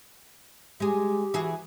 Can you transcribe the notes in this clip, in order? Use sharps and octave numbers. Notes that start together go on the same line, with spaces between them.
G#3 G4 G#4
E3 F#4 G#4